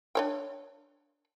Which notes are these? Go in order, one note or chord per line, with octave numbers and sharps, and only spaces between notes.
D4 C#5 G5